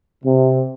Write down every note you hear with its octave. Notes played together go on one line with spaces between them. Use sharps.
C3